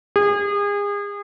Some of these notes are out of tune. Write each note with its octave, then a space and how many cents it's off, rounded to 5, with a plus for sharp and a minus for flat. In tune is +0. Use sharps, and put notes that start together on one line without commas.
G#4 -35